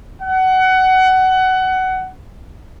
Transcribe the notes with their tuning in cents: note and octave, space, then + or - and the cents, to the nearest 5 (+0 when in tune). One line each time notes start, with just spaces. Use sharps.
F#5 +20